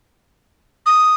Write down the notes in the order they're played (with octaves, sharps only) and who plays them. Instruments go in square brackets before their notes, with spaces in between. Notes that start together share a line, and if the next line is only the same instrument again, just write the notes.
[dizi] D#6